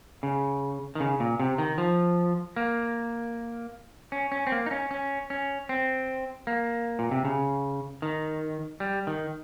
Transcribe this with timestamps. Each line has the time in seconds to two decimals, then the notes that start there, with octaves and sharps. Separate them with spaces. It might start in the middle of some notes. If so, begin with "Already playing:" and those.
0.23 C#3
0.95 D#3
1.00 C#3
1.20 A#2
1.40 C3
1.58 D#3
1.78 F3
2.56 A#3
4.12 C#4
4.32 C#4
4.47 C4
4.52 A#3
4.66 D#4
4.71 C#4
4.91 C#4
5.30 C#4
5.69 C4
6.47 A#3
6.99 A#2
7.11 C3
7.25 C#3
8.02 D#3
8.80 G3
9.07 D#3